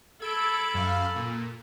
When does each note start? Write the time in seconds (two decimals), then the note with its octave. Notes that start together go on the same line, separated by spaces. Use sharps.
0.22 A4 B5 E6 G#6 D7
0.74 F#2 F5
1.16 A#2